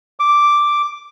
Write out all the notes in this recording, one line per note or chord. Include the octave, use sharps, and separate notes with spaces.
D6